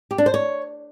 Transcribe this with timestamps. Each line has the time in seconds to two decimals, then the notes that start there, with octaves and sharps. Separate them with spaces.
0.11 G4
0.18 D4
0.26 C5
0.34 C#5